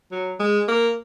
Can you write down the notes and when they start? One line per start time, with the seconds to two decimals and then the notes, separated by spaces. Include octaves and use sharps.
0.12 F#3
0.40 G#3
0.68 A#3